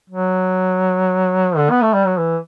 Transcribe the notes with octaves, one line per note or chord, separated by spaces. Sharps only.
F#3
D3
B3
A3
G3
F#3
E3